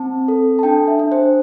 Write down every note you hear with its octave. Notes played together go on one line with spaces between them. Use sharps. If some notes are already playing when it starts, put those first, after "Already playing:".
Already playing: C4 A5
A4
A5
D4 G5
E5
D4
C5